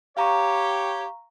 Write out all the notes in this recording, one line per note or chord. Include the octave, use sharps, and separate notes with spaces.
G4 C#5 F5 A#5 C#6